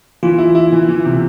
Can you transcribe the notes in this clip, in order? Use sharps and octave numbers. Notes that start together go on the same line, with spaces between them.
E3 F4
E4
E4
E3
E3
C3